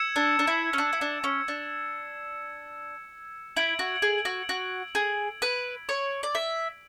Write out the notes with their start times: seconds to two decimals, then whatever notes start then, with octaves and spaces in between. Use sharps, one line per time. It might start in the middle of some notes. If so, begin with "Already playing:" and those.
Already playing: E6 G#6 C#7 E7
0.16 D4
0.39 D4
0.47 E4
0.73 C#4
0.78 D4
0.93 E4
1.01 D4
1.24 C#4
1.48 D4
3.56 E4 G#6 D7 F#7
3.79 F#4
4.02 G#4
4.25 F#4
4.49 F#4
4.95 G#4
5.42 B4
5.89 C#5
6.23 D5
6.35 E5